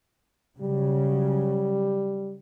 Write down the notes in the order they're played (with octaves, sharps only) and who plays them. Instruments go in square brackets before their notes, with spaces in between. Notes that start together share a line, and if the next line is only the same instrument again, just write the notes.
[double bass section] C#3 F#3 [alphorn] G3